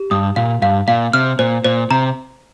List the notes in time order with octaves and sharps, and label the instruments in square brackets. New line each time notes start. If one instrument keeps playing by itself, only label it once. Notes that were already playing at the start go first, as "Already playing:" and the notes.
Already playing: [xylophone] G4
[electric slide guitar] G2 [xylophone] D#6
[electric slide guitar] A#2 [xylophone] F5
[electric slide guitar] G2 [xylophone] F5
[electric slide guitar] A#2 [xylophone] F5
[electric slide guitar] C3 [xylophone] F6
[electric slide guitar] A#2 [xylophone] C5
[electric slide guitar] A#2 [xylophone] C5
[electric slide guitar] C3 [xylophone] A#5